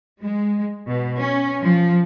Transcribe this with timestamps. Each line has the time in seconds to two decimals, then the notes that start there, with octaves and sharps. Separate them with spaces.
0.21 G#3
0.87 B2
1.20 C#4
1.62 F3